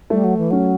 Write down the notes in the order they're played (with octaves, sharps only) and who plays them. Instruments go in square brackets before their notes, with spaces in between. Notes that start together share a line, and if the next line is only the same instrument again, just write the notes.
[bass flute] G3 [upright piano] A3
[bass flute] F#3
E3
[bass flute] F#3 [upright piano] C#4